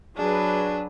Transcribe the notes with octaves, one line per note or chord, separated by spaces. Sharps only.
F#3 D4 G#4 B4